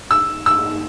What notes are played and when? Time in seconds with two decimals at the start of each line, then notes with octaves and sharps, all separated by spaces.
0.11 E6
0.46 E6